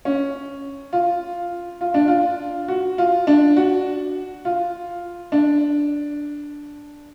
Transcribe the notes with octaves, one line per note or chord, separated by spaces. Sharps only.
C#4
F4
F4
D4
F4
F#4
F4
D4
F#4
F4
D4